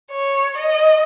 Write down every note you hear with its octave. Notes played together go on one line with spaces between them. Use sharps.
C#5
D#5